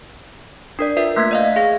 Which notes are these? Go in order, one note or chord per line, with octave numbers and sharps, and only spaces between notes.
D4 A#4 D5
F4 A#4 B4 E5
A3 A#3 E5 F#6 G#6 B6
D5 D#5 F5
G#4 F5 A#6